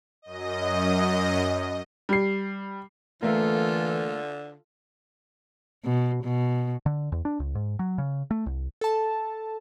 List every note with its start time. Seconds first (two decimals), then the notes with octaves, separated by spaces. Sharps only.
0.22 F#2 D#5
2.09 G3 C7
3.23 D3 E3 A3 A#3 F4 A4
5.84 B2
6.23 B2
6.86 D3
7.12 E2
7.25 D4
7.40 C#2
7.55 G#2
7.79 F#3
7.98 C#3
8.31 A3
8.46 C2
8.81 A4 A5